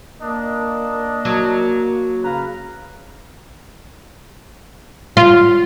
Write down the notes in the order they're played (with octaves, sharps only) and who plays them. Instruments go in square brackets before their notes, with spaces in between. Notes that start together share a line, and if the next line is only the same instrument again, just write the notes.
[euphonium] A#3 [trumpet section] D4 D#5
[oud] F#3 [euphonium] A#3
[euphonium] C#3 [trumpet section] B4 F5 A#5
[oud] F4